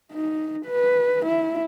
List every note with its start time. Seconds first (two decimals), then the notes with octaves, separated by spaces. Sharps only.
0.12 D#4
0.66 B4
1.26 E4